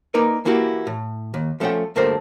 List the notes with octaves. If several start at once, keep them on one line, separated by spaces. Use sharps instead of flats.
A#3 D#4 A#4 B4 D5
E3 A#3 E4 F#4 G4
A2
D#2
F3 A3 C#4 A4 F#5 G5
D2 G2 A3 A#3 A#4 C5